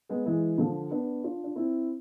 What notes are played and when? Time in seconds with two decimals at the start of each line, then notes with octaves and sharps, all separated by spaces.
0.09 G#3 B3
0.26 E3 G#3
0.58 D3 F3
0.91 B3 D4
1.24 D4 F4
1.44 D4
1.56 C4 E4